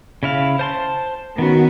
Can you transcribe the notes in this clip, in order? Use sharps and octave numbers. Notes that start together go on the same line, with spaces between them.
C#3 E4 F5
C5 A5 C6
D#3 B3 C#4 F#4